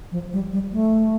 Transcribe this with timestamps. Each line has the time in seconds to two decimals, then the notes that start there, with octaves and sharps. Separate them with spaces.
0.11 F3
0.33 G3
0.52 G3
0.72 A3